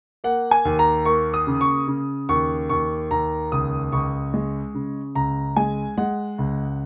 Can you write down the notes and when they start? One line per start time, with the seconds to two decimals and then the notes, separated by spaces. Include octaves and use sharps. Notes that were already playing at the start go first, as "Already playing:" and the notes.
0.24 A#3 F#5
0.51 G#5
0.65 D#2
0.79 A#5
1.05 A#3 C#6
1.34 D#6
1.47 C#3
1.61 C#6
1.88 C#3
2.29 D#2 C#6
2.69 D#2 C#6
3.11 D#2 A#5
3.52 C#2 D#6
3.92 C#2 C#6
4.34 G#3
4.74 C#3
5.15 C#2 A#5
5.56 G#3 G#5
5.98 G#3 F#5
6.38 C#2